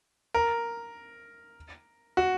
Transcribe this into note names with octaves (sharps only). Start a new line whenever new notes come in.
A#4
F#4